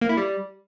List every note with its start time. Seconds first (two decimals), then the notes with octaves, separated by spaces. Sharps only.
0.01 A#3
0.09 E4
0.17 G3